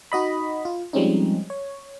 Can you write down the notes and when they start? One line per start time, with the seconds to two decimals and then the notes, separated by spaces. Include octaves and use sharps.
0.12 D#4 F#4 D#5 B5
0.65 F4
0.93 F3 G3 G#3 C4 C#4 D#4
1.50 C#5